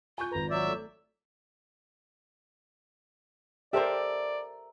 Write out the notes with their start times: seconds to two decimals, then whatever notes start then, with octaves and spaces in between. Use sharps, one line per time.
0.18 F4 G#5 C#6 G6
0.31 G#1 B4 A#5
0.50 F#3 D5 E5
0.67 A3
3.73 G4 A4 A#4 C5 D5 E5